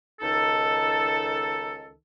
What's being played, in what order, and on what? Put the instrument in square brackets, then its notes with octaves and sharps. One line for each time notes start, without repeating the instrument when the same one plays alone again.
[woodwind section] C#2 D#3 D#4 A4